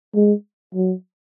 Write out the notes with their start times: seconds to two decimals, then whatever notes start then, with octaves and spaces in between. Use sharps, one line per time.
0.15 G#3
0.75 F#3